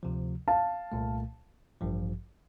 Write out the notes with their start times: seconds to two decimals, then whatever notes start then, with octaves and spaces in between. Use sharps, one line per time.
0.03 D2 C3 F3
0.48 F5 A5
0.92 C2 A#2 A3
1.81 A1 G2 F3